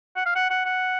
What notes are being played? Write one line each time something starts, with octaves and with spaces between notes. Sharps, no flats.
F#5
F5
F#5
F#5
F#5